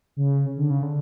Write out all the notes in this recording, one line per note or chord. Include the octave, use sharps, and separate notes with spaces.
C#3
D3
C#3
D3